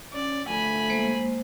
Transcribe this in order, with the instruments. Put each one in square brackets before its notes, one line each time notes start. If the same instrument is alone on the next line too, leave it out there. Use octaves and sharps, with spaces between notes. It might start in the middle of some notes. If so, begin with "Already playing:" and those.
[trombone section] C#4 [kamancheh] D5
[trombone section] D3 F3 A3 [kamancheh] G#5 B5
[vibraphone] G#3 A#3 C5